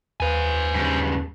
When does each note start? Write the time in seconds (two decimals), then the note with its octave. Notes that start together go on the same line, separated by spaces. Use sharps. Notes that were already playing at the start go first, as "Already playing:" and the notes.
0.20 D#2 B4 C5 F5 G#5
0.75 G2 C#3